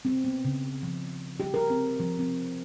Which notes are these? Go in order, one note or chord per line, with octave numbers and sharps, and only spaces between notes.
C4
B3
C#3
F3
G4
A#4
C4
F3
C4